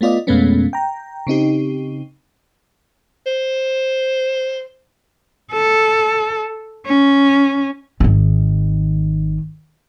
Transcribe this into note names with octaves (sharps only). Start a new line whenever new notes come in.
A3 B3 F4 D5 D#5
F2 B2 G#3 A3 B3 C#4
G5 A#5
C#3 C4 D#4 G4
C5
A4
C#4
G#1 D#3